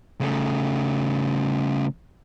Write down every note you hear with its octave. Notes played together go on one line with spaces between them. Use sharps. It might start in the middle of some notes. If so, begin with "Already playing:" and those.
C#3 A3